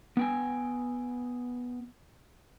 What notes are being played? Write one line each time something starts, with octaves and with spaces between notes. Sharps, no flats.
B3 G5 G#5